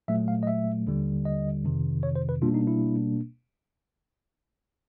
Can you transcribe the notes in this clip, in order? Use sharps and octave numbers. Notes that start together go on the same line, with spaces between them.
A#2 F#3 A3 E5
F5
D#5
E5
D#2 D3 G3
D#5
F2 C3 D#3
C#5
C5
B4
B2 G3 A#3 D4 F4
D#4
E4